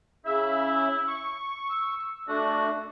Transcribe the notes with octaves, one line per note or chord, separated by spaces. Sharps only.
C#3 E4 E5
C#6
E6
A3 D4 F#4